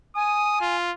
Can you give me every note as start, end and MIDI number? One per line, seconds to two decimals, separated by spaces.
0.16 0.76 80
0.16 0.59 87
0.61 0.92 65